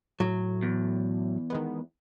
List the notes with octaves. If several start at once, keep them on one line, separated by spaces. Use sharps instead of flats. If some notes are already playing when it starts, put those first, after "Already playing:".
A2 F#3
E2
D#3 G#3 B3